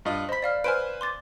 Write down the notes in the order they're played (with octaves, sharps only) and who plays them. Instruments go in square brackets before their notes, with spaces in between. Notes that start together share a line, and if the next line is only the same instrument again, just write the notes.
[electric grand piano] G2 F4 D#5
[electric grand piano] C5 B5 [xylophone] D#5 B6
[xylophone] D5 F5 F6
[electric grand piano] B4 C5 G#5 [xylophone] F6 D7
[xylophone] C6 D6 A6